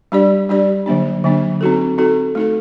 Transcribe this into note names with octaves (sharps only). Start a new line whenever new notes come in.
G3 D4 G4 D5
G3 D4 G4 D5
D3 F#3 A#3 D4
D3 F#3 A#3 D4
C4 D#4 F#4 A4
C4 D#4 F#4 A4
A3 D#4 A4